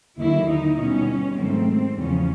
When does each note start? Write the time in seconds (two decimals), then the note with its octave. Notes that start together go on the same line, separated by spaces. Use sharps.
0.18 D#2 D3 F#3 A#3 E4
0.48 D#4
0.78 B2 G3 B3 C#4
1.37 G#2 D#3 F#3 A3 C4
1.97 E2 C#3 F3 C#4